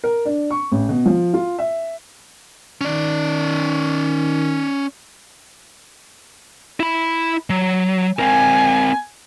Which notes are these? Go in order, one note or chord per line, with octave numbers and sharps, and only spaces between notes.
A#4
D4
C#6
A1
B2
F3
F4
E5
D#3 C#4 D5
E4 B5
F#3
C4 A#4 G#5